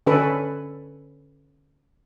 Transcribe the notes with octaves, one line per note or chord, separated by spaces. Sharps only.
D3 C#4 A4 B4